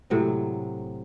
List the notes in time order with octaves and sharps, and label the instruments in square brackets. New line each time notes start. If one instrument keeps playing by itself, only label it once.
[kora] A2 C3 F#3 G#3